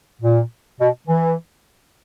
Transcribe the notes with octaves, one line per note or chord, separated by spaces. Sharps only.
A#2
B2
E3